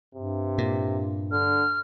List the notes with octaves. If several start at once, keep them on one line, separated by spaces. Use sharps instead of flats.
G2 C3
A#2
D3 F6